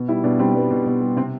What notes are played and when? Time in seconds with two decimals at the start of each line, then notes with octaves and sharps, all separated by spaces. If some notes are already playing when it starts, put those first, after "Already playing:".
Already playing: B2
0.08 G3 E4
0.24 B2 D4
0.39 G3 C4
0.54 G3 B3
0.71 B2
0.86 B2
1.01 G3
1.16 C3 C4